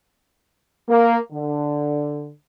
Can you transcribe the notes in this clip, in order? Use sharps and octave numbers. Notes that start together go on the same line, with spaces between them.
A#3
D3